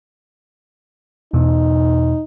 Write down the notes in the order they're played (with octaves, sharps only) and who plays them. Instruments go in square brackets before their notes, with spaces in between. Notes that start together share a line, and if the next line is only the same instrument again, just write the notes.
[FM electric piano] E2 B2 [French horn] D#4